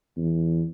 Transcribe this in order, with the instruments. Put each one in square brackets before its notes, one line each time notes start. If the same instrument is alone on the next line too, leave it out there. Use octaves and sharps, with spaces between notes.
[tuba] E2